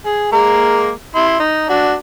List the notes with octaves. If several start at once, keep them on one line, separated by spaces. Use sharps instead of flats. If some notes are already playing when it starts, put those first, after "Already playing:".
G#4
G#3 A#3 A#4
E4 C6
D#4
D4 F#4